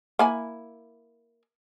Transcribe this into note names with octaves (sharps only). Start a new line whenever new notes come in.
A#3 E4 G#5